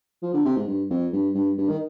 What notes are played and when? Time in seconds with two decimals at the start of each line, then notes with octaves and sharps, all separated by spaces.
0.23 F3
0.34 D3
0.45 C3
0.56 G#2
0.67 G2
0.90 F2
1.13 G2
1.35 G2
1.58 G2
1.69 D#3